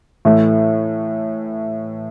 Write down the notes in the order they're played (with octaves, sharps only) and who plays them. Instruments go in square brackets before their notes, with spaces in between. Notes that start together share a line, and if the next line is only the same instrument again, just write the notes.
[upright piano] A2 E3 A3